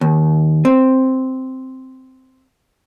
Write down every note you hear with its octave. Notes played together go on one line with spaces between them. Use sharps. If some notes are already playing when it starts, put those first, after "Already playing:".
D#2
C4